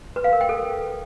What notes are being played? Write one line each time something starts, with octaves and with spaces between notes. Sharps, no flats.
B4
F5
A#4
G5
A4